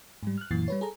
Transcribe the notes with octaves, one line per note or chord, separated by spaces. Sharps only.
G#2 G3
F6 F#6
F#2 A#2 E3 A6 C7
G3 B4 C#5
G#4 A4 A#5